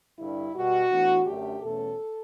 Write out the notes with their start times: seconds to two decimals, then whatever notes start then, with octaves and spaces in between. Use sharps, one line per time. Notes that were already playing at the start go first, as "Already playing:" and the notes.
0.19 G2 D3 G3 D4 E4
0.54 B2 G3 B3 F#4
0.89 A2 E3 B3 D4
1.25 F#2 D3 A3 D4 G4
1.62 E2 B2 A3 C#4 A4